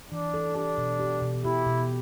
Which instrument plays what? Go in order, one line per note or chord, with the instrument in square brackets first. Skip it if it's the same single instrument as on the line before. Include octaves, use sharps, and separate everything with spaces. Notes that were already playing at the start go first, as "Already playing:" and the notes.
[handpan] E3 [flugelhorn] D4
[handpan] A4
[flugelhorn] D4 [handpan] G4
[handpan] B2
G4
B2
[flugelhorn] E4 [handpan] G4
[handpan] B2